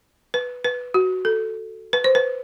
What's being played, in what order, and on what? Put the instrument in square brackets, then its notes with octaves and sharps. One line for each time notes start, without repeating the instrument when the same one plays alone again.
[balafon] B4
B4
F#4
A4
B4
C5
B4